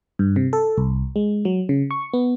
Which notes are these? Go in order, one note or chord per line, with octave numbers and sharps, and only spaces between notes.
G2
C3
A4
C2
G#3
F#3
C#3
C#6
B3